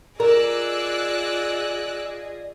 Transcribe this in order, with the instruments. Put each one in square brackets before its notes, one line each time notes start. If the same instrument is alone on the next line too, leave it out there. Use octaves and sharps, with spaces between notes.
[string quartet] F4 G#4 D#5 [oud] A#4 [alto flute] D5 [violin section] D6 E6 F#6